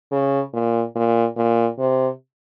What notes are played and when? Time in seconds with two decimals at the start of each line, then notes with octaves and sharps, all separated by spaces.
0.12 C#3
0.54 A#2
0.96 A#2
1.37 A#2
1.79 C3